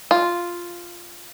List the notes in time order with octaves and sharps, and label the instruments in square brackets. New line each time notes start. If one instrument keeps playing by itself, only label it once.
[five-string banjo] F4